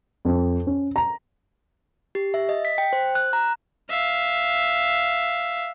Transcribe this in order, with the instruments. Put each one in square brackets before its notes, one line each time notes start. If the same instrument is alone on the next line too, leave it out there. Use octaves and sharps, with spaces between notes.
[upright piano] F2
C#4
A#5
[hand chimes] G4
E5
D#5
B6
G5
C5
F#6
A#5
[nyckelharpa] E5 F5